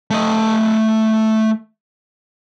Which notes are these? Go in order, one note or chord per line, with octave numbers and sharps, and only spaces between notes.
A3 D#5